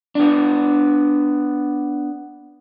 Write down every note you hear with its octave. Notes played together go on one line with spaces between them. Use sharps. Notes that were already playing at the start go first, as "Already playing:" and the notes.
B3 D4